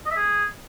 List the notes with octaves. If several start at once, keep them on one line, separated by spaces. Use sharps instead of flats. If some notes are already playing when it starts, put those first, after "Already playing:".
D#5
E5
G#4